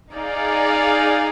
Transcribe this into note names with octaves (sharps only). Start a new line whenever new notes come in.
D#4 G#4 D5 F5